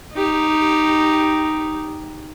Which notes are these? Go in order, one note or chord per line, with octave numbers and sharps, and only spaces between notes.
D#4 G4